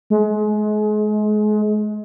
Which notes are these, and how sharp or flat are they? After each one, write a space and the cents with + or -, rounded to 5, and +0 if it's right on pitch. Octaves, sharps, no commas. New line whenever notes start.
G#3 +30